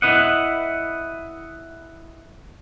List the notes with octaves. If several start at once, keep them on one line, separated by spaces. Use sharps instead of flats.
E4 B4 D#5 F#5